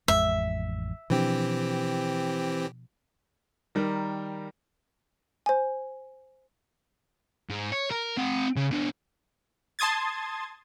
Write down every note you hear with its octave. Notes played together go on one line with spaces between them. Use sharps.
A1 F2 G#3 E5
B2 E3 F3 C4 D4 G4
D#3 G3 A#4
C5 G#5
G#2
C#5
A#4
C4 F#5
C#3
B2 D4
A5 C6 D#6 G#6 A6